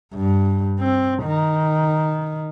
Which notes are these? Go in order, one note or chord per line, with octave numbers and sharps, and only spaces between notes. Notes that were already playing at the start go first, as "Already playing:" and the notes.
G2
C4
D#3